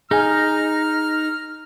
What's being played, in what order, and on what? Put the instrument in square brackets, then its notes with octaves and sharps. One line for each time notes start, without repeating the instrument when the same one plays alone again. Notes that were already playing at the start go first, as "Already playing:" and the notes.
[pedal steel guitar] D#4 [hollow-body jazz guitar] G#4 G#5 [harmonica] F6